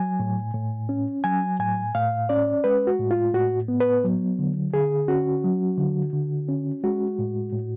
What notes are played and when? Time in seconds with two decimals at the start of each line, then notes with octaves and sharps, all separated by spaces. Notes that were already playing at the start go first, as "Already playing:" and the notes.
Already playing: F#3 G#5
0.20 A2
0.54 A2
0.89 C#4
1.24 F#3 G#5
1.60 A2 G#5
1.95 A2 F5
2.29 C#4 D5
2.64 G#3 B4
2.87 F#4
2.99 A2
3.11 F4
3.34 A2 F#4
3.68 B3
3.80 B4
4.04 F#3
4.39 D3
4.73 D3 G#4
5.08 C#4 F#4
5.44 F#3
5.78 D3
6.13 D3
6.49 C#4
6.84 G#3 F#4
7.19 A2
7.53 A2